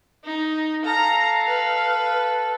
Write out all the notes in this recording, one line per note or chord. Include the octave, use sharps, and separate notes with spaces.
D#4
A4 F5 A#5
B4